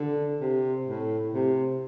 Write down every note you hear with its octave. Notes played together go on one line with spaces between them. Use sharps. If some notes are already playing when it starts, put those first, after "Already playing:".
Already playing: D3
C3
A2
C3